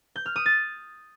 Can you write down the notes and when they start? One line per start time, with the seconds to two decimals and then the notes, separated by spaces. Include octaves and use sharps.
0.16 G6
0.26 F6
0.36 D#6
0.46 A6